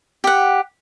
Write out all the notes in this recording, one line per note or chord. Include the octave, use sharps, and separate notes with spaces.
G4 F#5